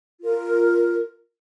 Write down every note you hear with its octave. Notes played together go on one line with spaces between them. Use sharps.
F4 A#4